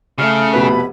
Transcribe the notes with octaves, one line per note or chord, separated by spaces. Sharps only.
C#3 A3 F6
F1 B2 B4 B5